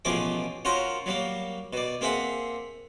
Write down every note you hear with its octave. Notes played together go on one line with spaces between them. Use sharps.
A1 B2 F3 G#4 G#5 D6
C#4 F4 F#4 A#4 C5
F#3 G3 A#3
B2 D5
A#3 C4 G#4 E5 F#5